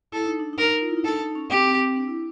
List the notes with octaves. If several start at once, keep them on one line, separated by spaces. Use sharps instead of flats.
E4 A4
D#4
D4
D#4
A#4
F4
E4
D#4
D4 A4
D#4
C#4
C4 G4
C4
C4
D4
E4